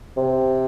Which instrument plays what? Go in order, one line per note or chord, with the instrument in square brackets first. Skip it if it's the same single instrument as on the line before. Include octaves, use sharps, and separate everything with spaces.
[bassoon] C3